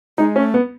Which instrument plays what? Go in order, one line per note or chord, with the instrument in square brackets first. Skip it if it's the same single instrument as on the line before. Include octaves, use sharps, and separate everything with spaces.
[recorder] G#3 [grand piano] D#4
[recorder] A3 [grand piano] C#4
[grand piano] B3